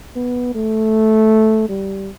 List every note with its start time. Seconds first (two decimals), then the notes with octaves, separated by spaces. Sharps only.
0.16 B3
0.55 A3
1.69 G3